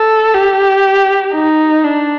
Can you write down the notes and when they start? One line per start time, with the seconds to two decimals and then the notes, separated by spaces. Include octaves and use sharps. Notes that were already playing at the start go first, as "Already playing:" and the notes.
Already playing: A4
0.34 G4
1.33 D#4
1.84 D4